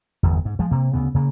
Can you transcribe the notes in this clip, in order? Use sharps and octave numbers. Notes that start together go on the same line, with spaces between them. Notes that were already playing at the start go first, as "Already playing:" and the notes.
G1 E2
G#2
F3 G#3
C3 A#3
D2 C#3 B3
C#3 A#3